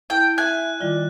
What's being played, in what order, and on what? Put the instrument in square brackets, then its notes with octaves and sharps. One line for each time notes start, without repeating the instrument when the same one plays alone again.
[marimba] E4 A5 [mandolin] G5
[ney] E5 [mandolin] G#5 [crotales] F#6
[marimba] D#3 G3 F4 [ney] D5